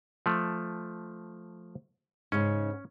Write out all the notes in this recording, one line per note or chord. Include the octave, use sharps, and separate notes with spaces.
F3 A3
G#2 C#3 C#4